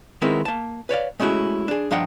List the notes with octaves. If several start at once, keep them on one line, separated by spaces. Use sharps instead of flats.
D#3 G#3 B3 C4 E4 A#4
A#3 A5
B4 C#5 D5 F5
G#3 A3 C#4 E4 F#4
D4 G#4
G2 F3 D4 D#4 F#5 G5